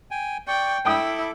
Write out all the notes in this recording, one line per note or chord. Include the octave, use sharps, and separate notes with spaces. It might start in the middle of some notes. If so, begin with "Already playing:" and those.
G5 G#5
D5 G5 C#6
E4 A4 G5 D6 D#6